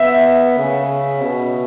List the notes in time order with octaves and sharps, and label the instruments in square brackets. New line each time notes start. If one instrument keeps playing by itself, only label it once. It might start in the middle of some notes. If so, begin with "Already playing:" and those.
Already playing: [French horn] B3 [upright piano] E5
[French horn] C#3
B2